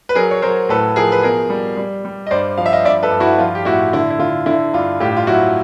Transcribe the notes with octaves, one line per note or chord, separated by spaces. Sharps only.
B4
F#3 G#4 A#4
C#5
F#3 A#4 C5
A2 A4 B4
F3 G#4 A#4
B4
B2 G#4 A#4
G3
G3
G3
D#5
G2 C5 D5
F3 F5
E5
D#5 F5
G2 D5 E5
A4 B4
G2
E4 F#4
F3 F4
G4
A2 E4 F#4
D3 E4
E4
D3 F4
D3 E4
G2 F4
A2 F4 G4
F4
F#3 E4 F#4